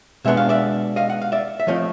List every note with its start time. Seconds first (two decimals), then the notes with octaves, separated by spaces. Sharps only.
0.25 B2 G#3 B3 D4 E5
0.37 F5
0.49 D5 E5
0.96 D#5 F5
1.10 F#5
1.21 F5
1.32 D5 E5
1.60 E5
1.67 F3 A3 C4 F4 C#5 D#5